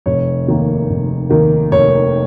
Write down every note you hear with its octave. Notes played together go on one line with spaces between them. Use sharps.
F1 C#5
D#2 D#3 A#3
F1
D#2 D#3 A#3
F1 C#5